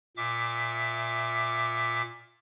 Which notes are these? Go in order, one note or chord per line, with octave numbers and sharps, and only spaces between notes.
A#2 E5 D6